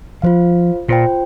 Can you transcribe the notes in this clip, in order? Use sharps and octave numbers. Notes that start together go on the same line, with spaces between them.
F3 F4 C5 F5
A#2 F4 C5 G5